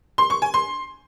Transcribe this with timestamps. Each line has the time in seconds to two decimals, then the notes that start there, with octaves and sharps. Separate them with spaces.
0.18 C6
0.30 C#6
0.42 G#5
0.54 C6